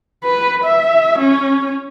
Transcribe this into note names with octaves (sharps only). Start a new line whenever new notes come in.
B4
E5
C#4